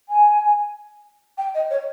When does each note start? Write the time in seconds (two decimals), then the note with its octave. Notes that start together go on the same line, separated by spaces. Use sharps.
0.08 G#5
1.37 G5
1.54 D#5
1.70 C#5